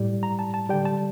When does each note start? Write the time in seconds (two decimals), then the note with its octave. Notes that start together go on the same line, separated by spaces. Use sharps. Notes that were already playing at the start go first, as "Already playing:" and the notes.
Already playing: A2 G3
0.23 A#5
0.39 A5
0.54 A5
0.69 D3 G3 G5
0.85 A5